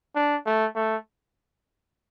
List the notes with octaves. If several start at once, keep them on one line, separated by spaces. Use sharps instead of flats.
D4
A3
A3